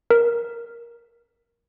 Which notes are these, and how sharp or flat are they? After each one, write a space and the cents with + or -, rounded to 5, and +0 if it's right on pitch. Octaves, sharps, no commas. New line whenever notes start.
A#4 +10